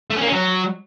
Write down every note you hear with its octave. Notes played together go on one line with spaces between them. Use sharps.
A3
C#4
A#3
C#4
F#3